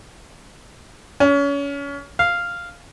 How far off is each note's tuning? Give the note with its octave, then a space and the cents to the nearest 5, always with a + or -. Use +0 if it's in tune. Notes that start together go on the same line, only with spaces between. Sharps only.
C#4 +30
F5 -5